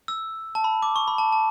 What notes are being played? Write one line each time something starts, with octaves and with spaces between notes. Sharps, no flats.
E6
A5
B5
D6
C#6
B5
A5
A5